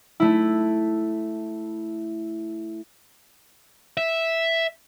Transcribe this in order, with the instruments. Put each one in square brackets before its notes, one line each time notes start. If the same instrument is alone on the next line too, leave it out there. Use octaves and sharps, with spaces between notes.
[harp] A3 E4
[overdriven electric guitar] E5